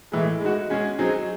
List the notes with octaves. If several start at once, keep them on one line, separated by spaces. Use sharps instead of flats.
A2 E3 G#3
G#3 D#4 F#4
G#3 C#4 G#4
F#3 C4 D#4 G#4